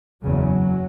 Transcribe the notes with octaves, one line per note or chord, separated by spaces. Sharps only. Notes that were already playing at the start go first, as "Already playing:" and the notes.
F#1 E2 C#3 F#3